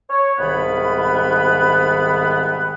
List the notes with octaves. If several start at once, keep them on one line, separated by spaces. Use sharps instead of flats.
C#5
C2 G#2 D#3 B3 B5